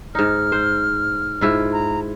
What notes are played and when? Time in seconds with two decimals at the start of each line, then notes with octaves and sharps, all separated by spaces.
0.15 G#2 D#4 F6
0.52 C5
1.41 G#2 E4 F4
1.73 A#5